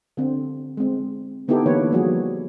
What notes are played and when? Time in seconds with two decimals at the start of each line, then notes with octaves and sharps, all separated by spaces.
0.17 D3 C4
0.77 G#3 C4
1.48 D3 B3 D#4 E4 G4 A4
1.66 D3 E3 A#3 E4 B4 C#5
1.92 F3 G3 A#3 B3 F#4 G#4